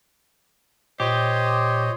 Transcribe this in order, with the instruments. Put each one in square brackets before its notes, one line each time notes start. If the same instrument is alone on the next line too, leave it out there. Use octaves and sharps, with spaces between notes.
[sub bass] A#2 [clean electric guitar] G4 [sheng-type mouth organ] C5 C#5 D#5